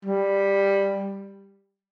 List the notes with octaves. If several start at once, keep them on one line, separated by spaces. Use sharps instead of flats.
G3